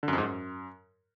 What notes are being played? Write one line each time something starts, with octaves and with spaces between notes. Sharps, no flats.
D3
F#2
F2
G#2
F#2